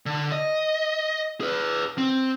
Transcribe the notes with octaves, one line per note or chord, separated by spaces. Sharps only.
D3
D#5
G#4 B4
C4